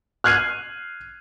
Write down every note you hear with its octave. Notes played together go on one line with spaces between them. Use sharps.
F6 F#6 G#6 C7 D#7